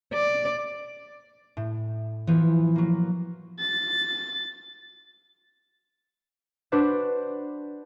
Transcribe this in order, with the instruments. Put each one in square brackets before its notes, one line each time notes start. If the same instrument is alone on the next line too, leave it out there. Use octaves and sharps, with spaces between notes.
[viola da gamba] D5
[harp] A2
[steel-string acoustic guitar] E3 [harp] F3 B3
[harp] F#3 A#3
[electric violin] A6
[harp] D4 F#4 B4 C5 D5